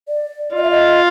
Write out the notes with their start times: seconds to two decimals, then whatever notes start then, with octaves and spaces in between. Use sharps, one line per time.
0.08 D5
0.55 F4 D#5
0.62 E5
0.70 D#5